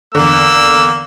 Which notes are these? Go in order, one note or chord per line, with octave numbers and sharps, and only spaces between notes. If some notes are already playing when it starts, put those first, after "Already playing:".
E2 D3 A#3 E6